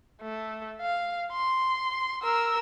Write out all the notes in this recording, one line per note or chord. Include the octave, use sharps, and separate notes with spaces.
A3
F5
C6
A#4 E6